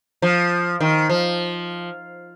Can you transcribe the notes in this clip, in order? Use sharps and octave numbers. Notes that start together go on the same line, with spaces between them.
F3
D#3
F3